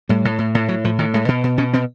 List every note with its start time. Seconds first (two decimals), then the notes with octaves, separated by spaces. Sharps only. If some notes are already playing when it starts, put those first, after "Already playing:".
0.09 A2 G3
0.25 A2
0.39 A2
0.55 A2
0.68 A2 F#3
0.84 A2 F3
0.98 A2 D#3
1.14 A2 G#3
1.28 B2
1.44 B2
1.58 B2 C#4
1.73 B2 C4